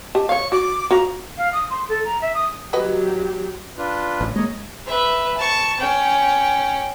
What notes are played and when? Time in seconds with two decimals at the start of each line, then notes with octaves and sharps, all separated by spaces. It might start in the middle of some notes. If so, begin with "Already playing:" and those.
0.15 G4 D#5 A5
0.29 C#5 F5 C#6
0.52 F#4 D6
0.91 F3 F#4 A#5
1.37 F5
1.53 D#6
1.70 C6
1.89 A4
2.05 A#5
2.21 E5
2.34 D#6
2.73 F#3 F#4 G4 B4 D#5
3.78 D4 F4 B4
4.21 A1
4.36 G#3 A#3 C#5 D#5
4.86 B4 E5
5.37 A5 C#6
5.80 C#4 G5